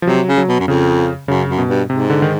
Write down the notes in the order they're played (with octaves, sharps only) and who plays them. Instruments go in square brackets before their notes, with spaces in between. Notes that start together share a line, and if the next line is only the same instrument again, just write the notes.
[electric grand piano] F3
[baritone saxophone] C3 [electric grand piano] F#3
[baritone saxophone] C#3
[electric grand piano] F#3
[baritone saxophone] B2
F#2
[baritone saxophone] F2 [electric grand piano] C#3
[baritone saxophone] F#2 [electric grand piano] C#3
[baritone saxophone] F#2
[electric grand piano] B2
[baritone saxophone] G2
[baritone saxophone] G#2 [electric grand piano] C3
[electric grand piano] D3
D#3